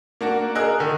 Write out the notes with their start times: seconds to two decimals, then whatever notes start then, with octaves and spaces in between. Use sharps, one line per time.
0.21 A#3 D4 F#4
0.55 G#4 A#4 D#5 E6 F#6
0.80 D3 D#3